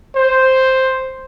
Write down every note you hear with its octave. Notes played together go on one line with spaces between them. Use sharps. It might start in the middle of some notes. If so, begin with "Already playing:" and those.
C5